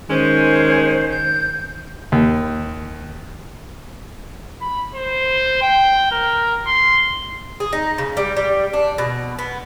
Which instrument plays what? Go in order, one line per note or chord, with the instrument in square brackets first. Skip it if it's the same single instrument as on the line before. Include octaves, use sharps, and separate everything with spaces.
[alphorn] D#3 [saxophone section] G#3 C#4 [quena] C5
[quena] G6
[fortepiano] D#2
[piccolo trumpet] B5
C5
G5
A#4
C6
[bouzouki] G#4
D#4
C#3
G3
G3
D4
B2
B3